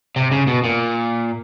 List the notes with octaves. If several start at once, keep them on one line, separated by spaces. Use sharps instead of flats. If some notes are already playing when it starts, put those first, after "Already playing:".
C3
C#3
B2
A#2